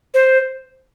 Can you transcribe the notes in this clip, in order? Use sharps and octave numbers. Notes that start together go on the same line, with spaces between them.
C5